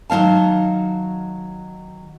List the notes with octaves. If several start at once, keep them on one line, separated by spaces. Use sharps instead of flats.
D#3 F#3 C#4 F5 A5